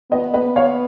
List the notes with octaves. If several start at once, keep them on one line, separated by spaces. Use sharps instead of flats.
B3 B4 D#5
B4 D#5
C#5 F5